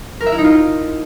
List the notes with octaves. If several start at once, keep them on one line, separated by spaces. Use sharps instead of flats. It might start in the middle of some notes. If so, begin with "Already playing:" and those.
A#4
E5
E4
D#4
F4